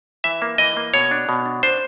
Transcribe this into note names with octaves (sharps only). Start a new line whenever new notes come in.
E3 E5
A#3
E3 D#5
A#3
B2 C#5
D4
B2
D4
D4 C5